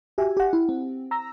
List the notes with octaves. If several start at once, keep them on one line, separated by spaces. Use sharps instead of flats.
F#4 G4 E5 G#5
G4 F#5
E4
C4
A#5 E6 A#6